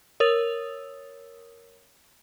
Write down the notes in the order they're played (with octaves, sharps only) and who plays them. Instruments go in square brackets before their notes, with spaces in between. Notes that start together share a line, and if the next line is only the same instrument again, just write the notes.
[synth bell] A#4 C#5 D#6 E6 A6 F7